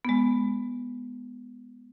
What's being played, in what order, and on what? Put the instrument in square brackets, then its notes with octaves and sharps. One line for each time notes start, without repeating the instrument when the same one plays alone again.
[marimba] G#3 B3